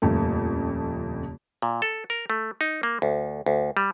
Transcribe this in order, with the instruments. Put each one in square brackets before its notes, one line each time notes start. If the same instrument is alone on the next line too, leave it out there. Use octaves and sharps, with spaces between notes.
[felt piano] D#1 F2 C#3 A3
[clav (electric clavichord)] A#2
A4
A#4
A3
D#4
A#3
D2
D2
G3